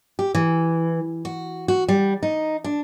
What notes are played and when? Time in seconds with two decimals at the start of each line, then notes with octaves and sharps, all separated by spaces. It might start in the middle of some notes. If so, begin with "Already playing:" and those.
0.19 G4
0.35 E3
1.25 F#4
1.68 F#4
1.88 G3
2.23 D#4
2.64 D4